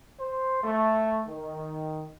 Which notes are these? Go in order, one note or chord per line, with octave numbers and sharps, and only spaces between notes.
C5
A3
D#3